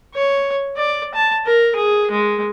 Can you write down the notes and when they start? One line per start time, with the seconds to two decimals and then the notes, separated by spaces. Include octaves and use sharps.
0.14 C#5
0.77 D5
1.15 A5
1.46 A#4
1.76 G#4
2.11 G#3